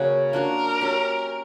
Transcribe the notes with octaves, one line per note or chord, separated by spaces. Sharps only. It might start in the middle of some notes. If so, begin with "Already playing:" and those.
Already playing: C#3 F#3 A#3 C#4 F#4
A#3 D4 F#4 A#4
F#3 C#4 G4